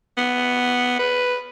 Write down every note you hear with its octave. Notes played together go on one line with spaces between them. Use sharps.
B3
B4